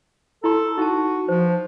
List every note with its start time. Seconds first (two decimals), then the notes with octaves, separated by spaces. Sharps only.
0.44 E4 A4 C6
0.78 D#4 F#4 A5
1.28 F3 C5